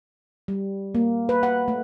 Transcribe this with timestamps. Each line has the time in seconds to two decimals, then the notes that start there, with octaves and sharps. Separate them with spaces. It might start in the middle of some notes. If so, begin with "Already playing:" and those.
0.48 G3
0.95 A#3
1.29 B4
1.43 F#5
1.68 A3